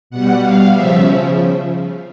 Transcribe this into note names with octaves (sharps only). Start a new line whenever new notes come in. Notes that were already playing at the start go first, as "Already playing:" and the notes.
B2 G3 F#5
F5
C#3 F3 E5